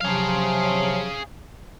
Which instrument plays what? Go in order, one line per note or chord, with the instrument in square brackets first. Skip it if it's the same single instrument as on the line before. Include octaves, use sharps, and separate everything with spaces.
[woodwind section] C3 F3 F#3 [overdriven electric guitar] G#4 F5